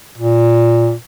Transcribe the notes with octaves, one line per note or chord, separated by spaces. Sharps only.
A#2